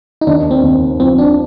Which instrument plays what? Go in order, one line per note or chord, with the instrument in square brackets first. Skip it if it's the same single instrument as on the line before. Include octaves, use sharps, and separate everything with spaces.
[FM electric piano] D#4
[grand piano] D#2 [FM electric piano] D4
[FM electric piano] C4
[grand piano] D#2
[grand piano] F3 [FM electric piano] C4
[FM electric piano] D4